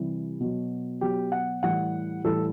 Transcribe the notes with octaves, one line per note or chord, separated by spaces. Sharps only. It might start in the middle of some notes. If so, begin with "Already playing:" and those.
Already playing: C3 E3 G3
B2 F#3
B2 F#3 G4
F#5
A2 E3 G3 F#5
A2 E3 G3 A4